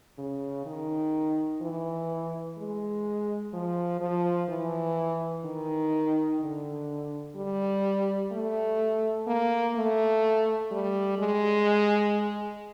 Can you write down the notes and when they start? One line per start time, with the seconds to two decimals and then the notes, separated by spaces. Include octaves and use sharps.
0.18 C#3
0.66 D#3
1.61 E3
2.58 G#3
3.54 F3
4.01 F3
4.49 E3
5.44 D#3
6.41 D3
7.36 G3
8.32 A3
9.27 A#3
9.76 A3
10.71 G3
11.19 G#3